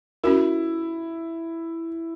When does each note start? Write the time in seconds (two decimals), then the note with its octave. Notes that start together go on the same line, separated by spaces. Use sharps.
0.24 C#4 E4 F#4 A#4